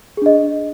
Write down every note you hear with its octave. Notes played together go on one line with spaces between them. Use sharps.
D4 G#4 D#5